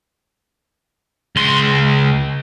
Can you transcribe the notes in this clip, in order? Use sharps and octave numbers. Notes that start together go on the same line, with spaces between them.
C#2 C6